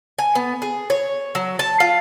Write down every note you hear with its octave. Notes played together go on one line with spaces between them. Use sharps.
G#5
B3
G#4
C#5
F#3
A5
F4